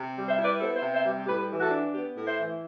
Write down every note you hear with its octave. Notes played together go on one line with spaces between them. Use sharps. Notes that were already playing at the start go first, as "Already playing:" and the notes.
Already playing: C3
G3
C5 E5
E4
B4 D5
B3 A4 C5
C5 E5
C3
C5 E5
G3
A2 G4 B4
E3
F#4 A4
D4
B3 G4
A2
C5 E5
E3